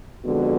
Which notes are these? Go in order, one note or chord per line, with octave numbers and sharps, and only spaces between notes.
F2 D3 G#3 B3 F#4